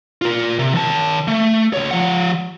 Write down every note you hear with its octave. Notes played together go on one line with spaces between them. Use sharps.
F4 A#4
C3
D#3 A5
A3
C#2 C#5
F3 F#5